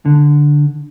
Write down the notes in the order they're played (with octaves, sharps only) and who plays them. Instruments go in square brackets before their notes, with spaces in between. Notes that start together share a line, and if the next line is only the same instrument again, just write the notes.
[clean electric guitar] D3